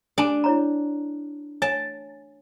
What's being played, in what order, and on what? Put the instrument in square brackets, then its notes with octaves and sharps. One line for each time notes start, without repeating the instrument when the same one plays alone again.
[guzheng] D4 [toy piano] G4 G#5 A5
[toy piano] E4 C#5 A#5
[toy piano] C#5 G#5 [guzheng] A5